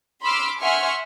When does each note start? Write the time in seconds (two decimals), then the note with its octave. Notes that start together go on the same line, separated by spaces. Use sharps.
0.23 B5 C6 D6 E6 F6
0.60 E5 F#5 G#5 C6 C#6 F6